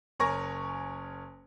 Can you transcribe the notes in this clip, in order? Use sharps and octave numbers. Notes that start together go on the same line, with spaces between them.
F#1 A#4 C#5 G#5 C#6 A#6